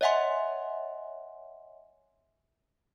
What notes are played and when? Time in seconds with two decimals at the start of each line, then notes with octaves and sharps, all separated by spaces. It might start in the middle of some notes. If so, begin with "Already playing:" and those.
0.01 C#5 D#5 E5 F#5 G#5 C6